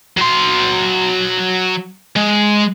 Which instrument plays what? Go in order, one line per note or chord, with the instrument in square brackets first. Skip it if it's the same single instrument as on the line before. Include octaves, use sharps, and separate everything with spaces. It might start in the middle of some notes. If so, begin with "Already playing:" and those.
[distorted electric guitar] F#3 C6
G#3